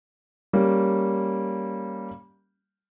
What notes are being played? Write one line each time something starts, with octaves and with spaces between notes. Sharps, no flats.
G3 A#3 C#4